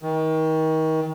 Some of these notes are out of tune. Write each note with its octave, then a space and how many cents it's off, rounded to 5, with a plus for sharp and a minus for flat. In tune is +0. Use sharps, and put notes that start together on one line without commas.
D#3 +30